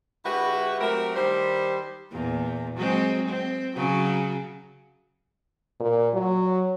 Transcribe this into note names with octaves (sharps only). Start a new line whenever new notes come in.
D3 G#3 E4 F#4 G4 B4
F#3 A3 C4 G4 A#4 E5
D#3 G3 D4 C5
E2 A#2
F#3 G#3 C4
C4
C#3 F#3
A#2
F#3